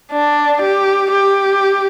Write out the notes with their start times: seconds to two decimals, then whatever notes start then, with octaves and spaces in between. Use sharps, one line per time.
0.12 D4
0.62 G4
1.12 G4